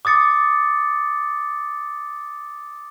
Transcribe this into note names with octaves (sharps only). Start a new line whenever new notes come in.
D6 D#6 A6 C#7